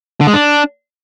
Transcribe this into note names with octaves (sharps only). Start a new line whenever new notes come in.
D3
G#3
D4